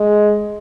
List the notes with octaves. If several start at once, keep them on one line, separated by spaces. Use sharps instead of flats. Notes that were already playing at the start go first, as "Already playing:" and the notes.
Already playing: G#3